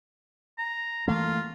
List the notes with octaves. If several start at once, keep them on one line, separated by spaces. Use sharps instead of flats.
A#5
E3 A3 A#3 F4